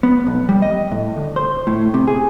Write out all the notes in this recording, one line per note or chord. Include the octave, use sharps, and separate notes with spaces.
B3
B1
G3
D#5
A2
D2
C5
A2
C3
G#4